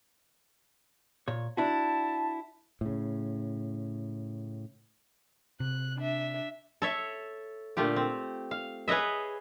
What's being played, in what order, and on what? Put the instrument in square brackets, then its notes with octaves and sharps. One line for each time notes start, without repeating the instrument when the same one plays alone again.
[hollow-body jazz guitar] A#2 C#5
[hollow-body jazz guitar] D4 E4 F#4 [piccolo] A5
[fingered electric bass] A2 C#3
[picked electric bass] C3 [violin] F#6
[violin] D4 E5
[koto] A4 C#5 E5
A#2 D3 A3 F4 G4
C4
F5
G#4 B4 C#5 D#5 E5